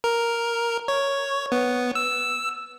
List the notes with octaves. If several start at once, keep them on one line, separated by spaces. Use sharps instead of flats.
A#4
C#5
B3
E6